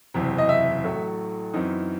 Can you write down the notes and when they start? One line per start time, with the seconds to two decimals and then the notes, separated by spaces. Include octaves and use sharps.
0.14 F#1 E2 C3
0.38 D#5
0.49 E5
0.84 A1 A2 F#3 A3
1.54 F#2 E3 C4 D#4